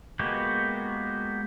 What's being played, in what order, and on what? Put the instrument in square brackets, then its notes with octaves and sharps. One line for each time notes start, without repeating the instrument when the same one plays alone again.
[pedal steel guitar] G#3 A#3 B3 F#4 G4